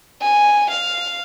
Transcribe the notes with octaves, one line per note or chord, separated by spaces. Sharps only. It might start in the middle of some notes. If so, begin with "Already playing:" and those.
G#5
F5